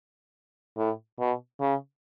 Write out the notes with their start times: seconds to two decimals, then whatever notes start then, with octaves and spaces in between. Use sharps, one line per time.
0.77 A2
1.19 B2
1.61 C#3